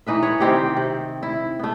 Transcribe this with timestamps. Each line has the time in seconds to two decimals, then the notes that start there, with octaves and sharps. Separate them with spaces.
0.07 E3 D#4 B4 E5
0.23 C#5 F#5
0.40 C3 D#3 C4 G4
0.77 C3
1.23 E4
1.59 A3 B3